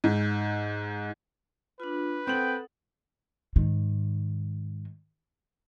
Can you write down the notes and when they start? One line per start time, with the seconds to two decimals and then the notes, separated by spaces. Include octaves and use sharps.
0.04 G#2
1.80 D4 F4 B4
2.27 C4 A4 F#5 G5 D#6 F#7
3.56 G#2 D#3